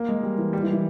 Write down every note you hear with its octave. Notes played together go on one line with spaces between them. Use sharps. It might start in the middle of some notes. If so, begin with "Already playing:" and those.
Already playing: A#3
G#3
G3
E3
G3
E3
E3